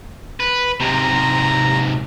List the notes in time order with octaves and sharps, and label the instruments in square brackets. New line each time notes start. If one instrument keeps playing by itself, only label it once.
[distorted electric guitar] B4
[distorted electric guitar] G#2 C3 [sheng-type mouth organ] A#5